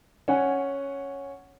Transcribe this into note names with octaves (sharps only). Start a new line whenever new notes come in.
C#4 F#5 G#5